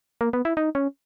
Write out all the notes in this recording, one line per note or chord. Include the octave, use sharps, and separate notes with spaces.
A#3
B3
E4
D#4
C#4